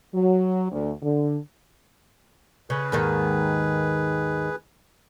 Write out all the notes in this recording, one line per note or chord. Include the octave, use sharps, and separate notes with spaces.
F#3
D2
D3
C#3 G#4 B4
D#2 G#2 D#3